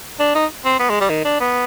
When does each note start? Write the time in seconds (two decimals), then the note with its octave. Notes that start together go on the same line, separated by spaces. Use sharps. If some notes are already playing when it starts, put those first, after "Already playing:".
0.19 D4
0.35 D#4
0.65 C4
0.79 B3
0.90 G#3
1.00 G3
1.10 D#3
1.25 D4
1.40 B3